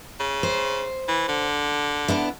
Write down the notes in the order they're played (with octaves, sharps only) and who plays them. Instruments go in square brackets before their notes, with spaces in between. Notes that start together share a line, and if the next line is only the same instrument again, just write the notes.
[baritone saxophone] C#3
[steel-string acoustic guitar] C5
[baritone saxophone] E3
D3
[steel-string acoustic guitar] B3 D4 E4